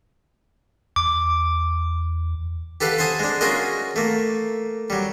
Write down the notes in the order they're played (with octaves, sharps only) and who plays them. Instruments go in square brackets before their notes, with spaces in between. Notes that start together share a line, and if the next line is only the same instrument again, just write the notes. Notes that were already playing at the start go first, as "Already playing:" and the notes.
[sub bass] E2 [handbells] D6
[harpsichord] G4 A4 B4 F5 F#5
C5 F#5 G#5 A5 D#6
G#3 D4
C#4 F4 F#4 G#4 A#4 D#5
A3 A#3
F#3 G3